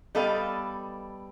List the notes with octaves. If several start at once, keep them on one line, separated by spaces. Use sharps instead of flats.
G3 B3 A4 D#5 F5